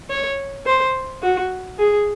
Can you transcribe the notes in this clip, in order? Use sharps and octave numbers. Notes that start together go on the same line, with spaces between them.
C#5
C5
F#4
G#4